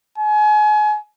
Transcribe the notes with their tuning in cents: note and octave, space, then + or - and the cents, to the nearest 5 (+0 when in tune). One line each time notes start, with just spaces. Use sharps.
G#5 +30